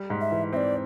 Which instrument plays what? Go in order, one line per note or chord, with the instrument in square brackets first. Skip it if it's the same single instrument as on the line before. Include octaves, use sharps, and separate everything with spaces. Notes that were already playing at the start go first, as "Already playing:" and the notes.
Already playing: [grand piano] G3
G#2
[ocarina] E5
[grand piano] E3
[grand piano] C4 [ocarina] E5
[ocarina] D5